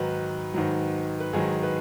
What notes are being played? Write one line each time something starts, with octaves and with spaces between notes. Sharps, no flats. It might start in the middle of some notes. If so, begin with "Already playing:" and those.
Already playing: G#2 D#3 F#3 B4
G#2 D#3 F#3
B4
G#2 D#3 F#3 G#4
B4